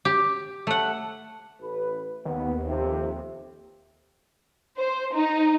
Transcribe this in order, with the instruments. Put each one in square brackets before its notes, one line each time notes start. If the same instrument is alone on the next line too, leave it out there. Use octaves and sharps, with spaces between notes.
[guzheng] G4
A3 F#5
[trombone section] A1 B4
[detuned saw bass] D#2 [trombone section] B3
[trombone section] F2 C3
[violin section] C5
D#4